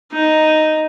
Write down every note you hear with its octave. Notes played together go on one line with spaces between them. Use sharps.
D#4